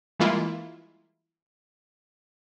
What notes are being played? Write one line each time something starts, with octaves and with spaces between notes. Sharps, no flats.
E3 G3 G#3 A#3 E4 F4